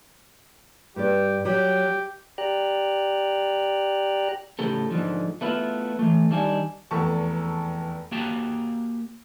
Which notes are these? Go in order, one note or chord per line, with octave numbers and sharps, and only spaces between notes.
G2 G4 D5
F#3 G4
G4 D5 G5 A#5 F#6
A2 C#3 G4 A4
G#2 B2 D3 F3
A3 B3 E4 F4
E3 A3
D#3 G3 D4 E5 G#5
F1 E2 A4 A5 C#6
A#3 F#4 G4 G5 A5